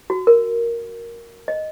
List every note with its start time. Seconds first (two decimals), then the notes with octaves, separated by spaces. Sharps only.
0.10 F#4
0.27 A#4
1.48 D#5